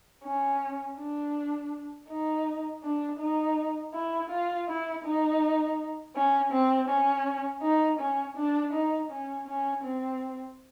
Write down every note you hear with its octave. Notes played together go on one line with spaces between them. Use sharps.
C#4
D4
D#4
D4
D#4
E4
F4
E4
D#4
C#4
C4
C#4
D#4
C#4
D4
D#4
C#4
C#4
C4